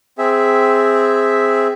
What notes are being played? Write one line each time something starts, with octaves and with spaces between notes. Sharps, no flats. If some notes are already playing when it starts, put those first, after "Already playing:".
C4 G#4 E5